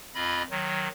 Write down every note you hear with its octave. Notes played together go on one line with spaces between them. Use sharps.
F2 F4 D#5 B5
D#3 F#3